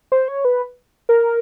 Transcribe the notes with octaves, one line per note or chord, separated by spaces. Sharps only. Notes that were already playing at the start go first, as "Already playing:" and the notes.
C5
C#5
B4
A#4